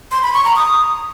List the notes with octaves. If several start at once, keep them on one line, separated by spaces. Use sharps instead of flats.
C6
B5
C#6
A#5
D#6